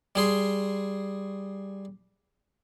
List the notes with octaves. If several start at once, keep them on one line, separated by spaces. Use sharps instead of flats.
G3 G#4 C6